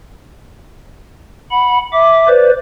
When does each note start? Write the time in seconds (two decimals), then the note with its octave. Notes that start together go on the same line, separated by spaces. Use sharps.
1.51 F#5 B5
1.92 E5 D6
2.28 B4 C5 D5